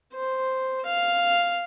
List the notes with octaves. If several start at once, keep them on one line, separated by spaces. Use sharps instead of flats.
C5
F5